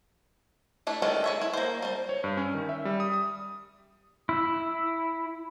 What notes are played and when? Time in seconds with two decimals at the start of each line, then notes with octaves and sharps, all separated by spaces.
0.87 A3 D4 E4
1.02 D#3 G#3 A3 C#4 D4
1.24 G#3 C#5 E5
1.41 E4
1.53 A#3 C5
1.82 G3 C4
2.09 C#5
2.24 G2
2.37 C#4
2.54 D#3
2.69 E5
2.85 G3
3.00 D#6
3.13 D#6
4.29 E4